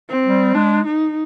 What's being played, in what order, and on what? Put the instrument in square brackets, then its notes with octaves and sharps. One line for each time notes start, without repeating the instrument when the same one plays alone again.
[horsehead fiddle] C4
[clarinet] G3
[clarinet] G#3 [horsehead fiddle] D4
[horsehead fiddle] D#4